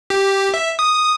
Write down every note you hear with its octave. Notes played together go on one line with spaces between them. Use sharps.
G4
E5
D#6